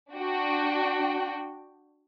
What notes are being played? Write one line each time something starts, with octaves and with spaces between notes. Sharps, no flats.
D4 F#4 G5